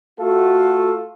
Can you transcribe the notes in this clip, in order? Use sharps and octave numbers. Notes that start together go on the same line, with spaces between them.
A3 F4 F#4 A4